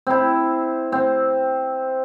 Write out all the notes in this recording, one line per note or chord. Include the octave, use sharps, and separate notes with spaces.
C4 E4
C4